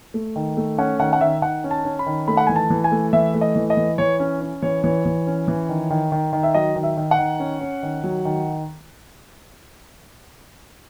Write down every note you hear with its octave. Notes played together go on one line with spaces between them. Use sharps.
A3
D#3
A3
C#4 F#5
D#3 F#5
F#5
D#3 E5
D#3 F#5
C#4
A5
C#4
B5
D#3
A3 B5
F#5
E3 G#5
A5
E3
G#5
A3
E3 E5
A3
D#5
E3
D#5
E3
E3 C#5
C#4
C#4
E3 C#5
E3 C#5
E3
C#4
E3
D#3
D#3
D#3
D#3
E5
F#3 D#5
D#3
E5
D#3
F#5
D#3
C#4
C#4
D#3
F#3
D#3